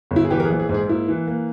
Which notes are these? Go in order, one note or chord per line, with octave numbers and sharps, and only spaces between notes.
G1
E4
G#4
E3 G4
A#4
G#4
A#1
G#4
G#2
G#4
A#3 E4
E3
A#3